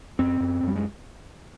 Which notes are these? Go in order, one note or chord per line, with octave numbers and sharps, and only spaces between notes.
F#2 C4
F#2
F#2 G3
G#3